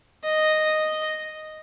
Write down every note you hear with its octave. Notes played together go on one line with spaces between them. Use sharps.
D#5